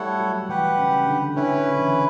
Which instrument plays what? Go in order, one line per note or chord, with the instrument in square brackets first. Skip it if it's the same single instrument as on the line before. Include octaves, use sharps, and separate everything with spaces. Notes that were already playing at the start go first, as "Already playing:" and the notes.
Already playing: [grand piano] G3 A3 [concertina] E4 A4 C#5 F#5
[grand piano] F#3
[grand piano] E3 [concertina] G4 B4 F#5
[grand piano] C#3
D3
[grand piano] D3 [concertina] C#4 E4 B4
[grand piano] C#3
D3
E3